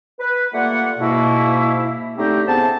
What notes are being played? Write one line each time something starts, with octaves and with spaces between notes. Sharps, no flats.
B4
G3 A3 A#3 F4 F#5
G#2 B2 A#3 E4
A2 D3 A3 C4 D#4 G4
A2 C#3 B3 C5 A5